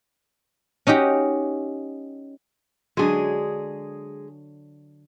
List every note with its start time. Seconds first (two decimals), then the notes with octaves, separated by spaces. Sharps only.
0.87 C#4 D#4 F#4 G4
2.97 D3 F#3 G#3 G#4